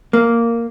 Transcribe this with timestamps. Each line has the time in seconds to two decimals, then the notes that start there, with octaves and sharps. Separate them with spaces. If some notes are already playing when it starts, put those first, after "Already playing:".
0.13 A#3